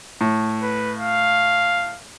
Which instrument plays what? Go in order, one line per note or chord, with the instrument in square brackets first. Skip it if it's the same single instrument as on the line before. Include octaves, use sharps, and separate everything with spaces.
[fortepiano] A2
[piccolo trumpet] B4
F5